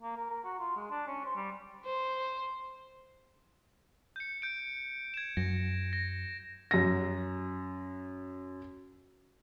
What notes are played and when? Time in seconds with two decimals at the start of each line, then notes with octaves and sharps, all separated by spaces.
0.02 A#3
0.16 A#4
0.30 A#4
0.44 F#4
0.59 F4
0.76 G#3
0.91 D4
1.07 C#4
1.24 C5
1.36 G3
1.85 C5
4.16 G6 C#7
4.42 G6 D7
5.14 G#6 E7
5.37 F#2 A#6
5.93 A#6
6.71 F#2 A#6